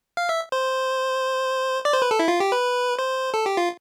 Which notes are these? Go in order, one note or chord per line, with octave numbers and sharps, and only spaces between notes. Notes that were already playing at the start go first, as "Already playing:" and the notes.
F5
E5
C5
D5
C5
B4
A4
E4
F4
G4
B4
C5
A4
G4
F4